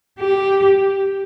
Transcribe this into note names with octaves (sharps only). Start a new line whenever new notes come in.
G4